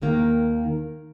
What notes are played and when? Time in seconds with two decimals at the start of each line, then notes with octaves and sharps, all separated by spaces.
0.02 D#2 D#3 A#3